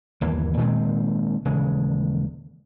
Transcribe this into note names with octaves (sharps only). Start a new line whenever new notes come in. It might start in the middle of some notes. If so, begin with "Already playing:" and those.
G1 D#2 E3 A#3
A#2 D#3 G#3 C4
D#1 C#3 E3 G#3